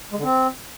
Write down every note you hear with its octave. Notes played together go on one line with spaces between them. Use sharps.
G#3
D3
C4